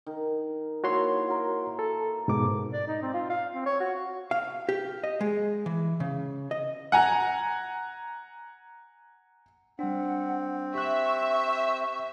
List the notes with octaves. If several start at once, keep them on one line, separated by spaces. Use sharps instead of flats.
D#3
A#3 E4 F#4 C#5 C6
A#4 F#5
A4
G#2 B2 D6
D5
D#4
C4
F4
F5
C4
C#5
F#4
F5
G4
D#5
G#3
E3
C#3
D#5
F#5 G#5 A#5
G3 C4 D4 F#5
G4 E5 C#6 F#6